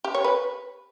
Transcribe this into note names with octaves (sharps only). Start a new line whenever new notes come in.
G4
C#5
B4